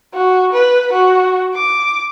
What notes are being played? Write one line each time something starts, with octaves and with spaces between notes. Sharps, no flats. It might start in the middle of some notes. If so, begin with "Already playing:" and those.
F#4
B4
F#4
D6